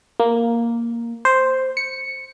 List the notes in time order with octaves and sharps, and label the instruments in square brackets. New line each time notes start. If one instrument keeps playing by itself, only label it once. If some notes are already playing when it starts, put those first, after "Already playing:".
[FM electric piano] A#3
C5
C#7